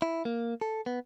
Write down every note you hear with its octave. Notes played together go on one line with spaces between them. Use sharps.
E4
A#3
A4
B3